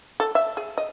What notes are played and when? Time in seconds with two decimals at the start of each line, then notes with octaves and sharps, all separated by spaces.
0.20 A4
0.35 E5
0.57 G#4
0.78 D#5